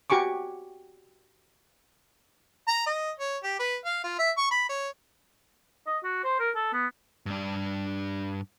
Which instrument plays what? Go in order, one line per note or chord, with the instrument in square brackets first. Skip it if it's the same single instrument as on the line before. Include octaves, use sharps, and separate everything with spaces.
[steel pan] F#4 G4 G#5 C#6 D6
[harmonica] A#5
D#5
C#5
G4
B4
F5
F4
E5
C#6
B5
C#5
[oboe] D#5
F#4
C5
A#4
A4
B3
[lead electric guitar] G2 D4